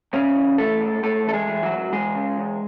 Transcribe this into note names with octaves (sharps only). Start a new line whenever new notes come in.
G#2 C#3 C#4
E3
E3 A3 A4
G#2
G#2 A3 A4
E3 A4
G#3 G#4
E3
F#3 F#4
G#2
E2 G#3 G#4
C#3
E2